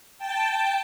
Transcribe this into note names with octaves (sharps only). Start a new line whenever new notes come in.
G5 A5